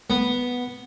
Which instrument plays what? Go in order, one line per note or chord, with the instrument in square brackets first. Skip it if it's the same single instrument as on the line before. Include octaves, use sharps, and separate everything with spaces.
[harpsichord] B3